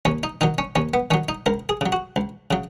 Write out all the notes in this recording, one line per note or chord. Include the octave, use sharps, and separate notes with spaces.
D#2 C#4
D#4
D#3 F#3 D#4
C#4
D#2 C#4
B3
D#3 F#3 C#4
D#4
C#2 A#4
G#4
C#3 F#3
F#4
C#2
C#3 F#3